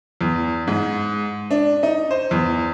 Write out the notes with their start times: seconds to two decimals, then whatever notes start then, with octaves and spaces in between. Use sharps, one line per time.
0.21 E2
0.67 G#2
1.51 D4
1.83 D#4
2.11 C5
2.31 E2